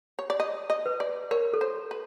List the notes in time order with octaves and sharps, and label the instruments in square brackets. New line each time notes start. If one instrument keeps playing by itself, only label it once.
[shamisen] C#5
D5
D#5
D#5
[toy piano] B4
[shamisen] D5
[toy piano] A#4 [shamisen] C#5
[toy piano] A4
[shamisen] C5
B4